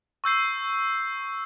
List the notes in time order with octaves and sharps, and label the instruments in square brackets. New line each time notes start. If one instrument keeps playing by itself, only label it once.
[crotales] C#6 E6 G6 C7